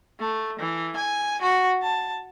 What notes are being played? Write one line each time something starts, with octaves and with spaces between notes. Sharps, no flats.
A3
E3
G#5
F#4
A5